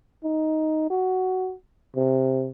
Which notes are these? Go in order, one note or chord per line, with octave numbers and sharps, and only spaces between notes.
D#4
F#4
C3